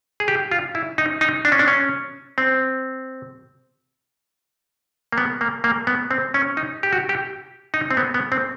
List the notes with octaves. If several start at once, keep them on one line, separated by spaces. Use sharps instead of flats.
G#4
G4
F4
E4
D#4
D#4
D4
C#4
D4
C#4
C4
A#3
B3
A#3
A#3
B3
C4
C#4
D#4
G4
F#4
G4
D#4
C4
B3
B3
C4